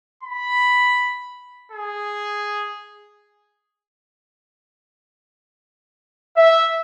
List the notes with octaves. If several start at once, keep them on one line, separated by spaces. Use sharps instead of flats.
B5
G#4
E5